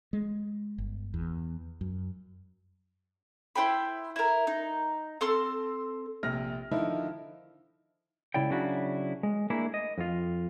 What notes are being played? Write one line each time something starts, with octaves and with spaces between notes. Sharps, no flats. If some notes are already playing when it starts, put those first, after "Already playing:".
G#3
G1
E2
F#2
E4 C5 G5 B5
E4 A#4
D#4
C4 A4 C6 F6
A#1 C3 F6 A#6
D3 D#3 F3 D#4 E4
C#2 G2 C#3 E4 D5 G5
C#3 F#3 D4 E4 F#4
G#3
A3 A#3 D4 E4 G#4
D#5
F2 F4